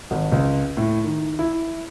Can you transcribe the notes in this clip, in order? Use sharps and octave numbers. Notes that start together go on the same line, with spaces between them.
G#1
C#2
A2
D#3
E4